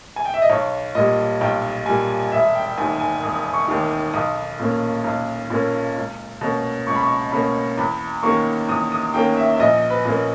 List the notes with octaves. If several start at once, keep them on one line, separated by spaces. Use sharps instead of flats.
G#5
G5
E5
D#5
B1 C#5
A#2 G3 D#5
B1 G5
A#2 G3 G#5
E1 E5
G5
G5
D#2 D#3 G#5
G#5
E1 D#6
C#6
D#2 D#3
B1 D#6
A#2 A#3 C#4
B1
A#2 A#3 C#4
C#2
B2 A#3 C#4
C#2 C#6
B5
C#6
B2 A#3 C#4 B5
E2 B5
D#3 A#3 C#4 C#6
E2 D#6
D#6
D#3 A#3 C#4 G5
E5
E5
A#1 D#5
B4
A#2 A#3 C#4